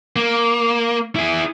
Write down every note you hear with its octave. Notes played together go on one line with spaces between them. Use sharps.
A#3
E4 G#4